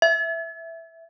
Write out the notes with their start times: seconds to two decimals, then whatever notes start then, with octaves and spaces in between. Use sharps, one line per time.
0.02 E5